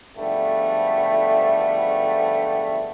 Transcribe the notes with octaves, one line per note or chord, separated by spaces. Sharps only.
G#2 D3 F3 G3 A3 B3